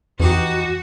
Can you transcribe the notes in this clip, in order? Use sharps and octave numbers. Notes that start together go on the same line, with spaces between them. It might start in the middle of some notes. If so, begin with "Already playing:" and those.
F2 E3 D#4 F#4 G4